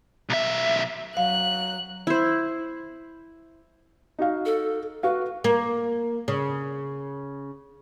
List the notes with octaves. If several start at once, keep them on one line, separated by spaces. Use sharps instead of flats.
B1 E5
F#3 F5 F#6
E4 C5
D#4 F#4 F5
A4
F#4 B4 F5
A#3
C#3